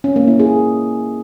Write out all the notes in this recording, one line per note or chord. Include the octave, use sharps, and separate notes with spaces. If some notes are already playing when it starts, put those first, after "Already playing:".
C#4
A#3
E4
G#4